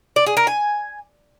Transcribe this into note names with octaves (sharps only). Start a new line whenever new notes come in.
D5
G#4
A#4
G#5